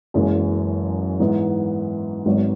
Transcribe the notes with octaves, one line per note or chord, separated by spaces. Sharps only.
F#1 F#2 E3 G#3 B3
G#2 E3 B3
G#1 G#2 F#3 B3 D#4